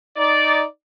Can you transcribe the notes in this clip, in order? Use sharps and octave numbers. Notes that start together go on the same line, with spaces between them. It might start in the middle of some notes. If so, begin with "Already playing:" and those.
D#4 D5